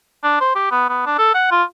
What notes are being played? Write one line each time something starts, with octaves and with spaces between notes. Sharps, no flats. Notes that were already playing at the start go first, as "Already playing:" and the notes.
D4
C5
G4
B3
B3
D4
A4
F#5
F4